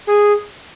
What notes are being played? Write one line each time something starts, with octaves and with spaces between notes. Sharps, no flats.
G#4